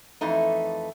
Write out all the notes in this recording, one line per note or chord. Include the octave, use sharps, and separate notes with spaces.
F2 E3 A3 D#4